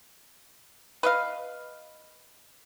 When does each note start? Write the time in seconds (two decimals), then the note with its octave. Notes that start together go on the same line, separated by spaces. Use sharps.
1.03 B4 D#5 F5